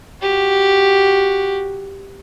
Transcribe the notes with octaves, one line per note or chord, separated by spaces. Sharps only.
F#4 G4